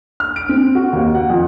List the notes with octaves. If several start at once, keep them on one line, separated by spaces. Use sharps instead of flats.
F6
D7
C4
F#4
D#2
F#5
F2